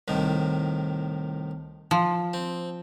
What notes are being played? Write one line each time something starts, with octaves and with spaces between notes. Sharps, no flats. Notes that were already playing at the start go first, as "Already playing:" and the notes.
C2 A2 D#3
F3
C4